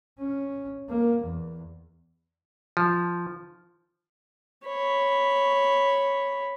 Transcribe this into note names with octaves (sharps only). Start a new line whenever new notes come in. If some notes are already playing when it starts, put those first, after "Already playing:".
C#4
A#3
E2
F3
C#5 B5